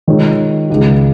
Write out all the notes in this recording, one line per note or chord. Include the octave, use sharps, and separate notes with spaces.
D#3 G#3 F4 C#5
C#2 C#3 G#3